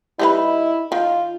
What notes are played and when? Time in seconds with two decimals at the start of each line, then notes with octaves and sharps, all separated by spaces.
0.19 G3 D#4 E4 B4
0.92 D#3 F4